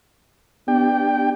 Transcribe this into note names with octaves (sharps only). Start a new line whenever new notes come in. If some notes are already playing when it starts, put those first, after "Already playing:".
B3 D4 G4 G5